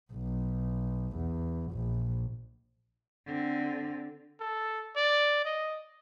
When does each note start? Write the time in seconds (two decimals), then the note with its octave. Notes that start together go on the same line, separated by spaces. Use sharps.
0.13 B1
1.16 E2
1.72 A#1
3.26 D3 C4
4.40 A4
4.96 D5
5.45 D#5